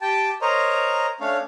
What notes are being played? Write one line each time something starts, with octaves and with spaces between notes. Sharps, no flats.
G4 G5 A5
A#4 C5 C#5 D#5 A#5
A3 C#4 D4 C#5 F5